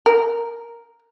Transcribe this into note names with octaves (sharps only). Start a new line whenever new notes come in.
A#4